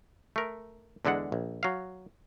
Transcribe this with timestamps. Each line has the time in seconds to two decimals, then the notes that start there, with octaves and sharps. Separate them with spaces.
0.36 A3 A#4
1.05 E2 D3 G#3 D4 F#5
1.32 A#1
1.63 F#3 F5